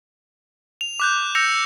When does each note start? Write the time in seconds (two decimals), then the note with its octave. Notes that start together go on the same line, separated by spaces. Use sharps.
0.81 F7
1.00 D6 F#6 G6
1.35 E6 G6 A#6 C#7 F7